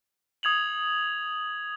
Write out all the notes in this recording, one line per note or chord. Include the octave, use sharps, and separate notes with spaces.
D#6 G#6 F7 F#7